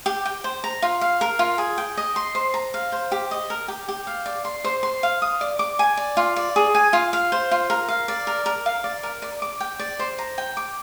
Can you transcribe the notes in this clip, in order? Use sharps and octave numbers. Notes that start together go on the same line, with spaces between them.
G4
G5
C5
A#5
F4
F5
A#4
F4
G#4
G5
D#5
C6
C5
A#5
F5
C5
G4
D#5
A#4
G4
G4
F5
D5
C6
C5
C6
F5
D#6
D5
D6
G#5
D5
F4
D5
G#4
G#5
F4
F5
C5
F4
A#4
F5
D5
A#4
A#4
F5
D5
A#4
D5
D6
G5
D5
C5
A#5
G5
D6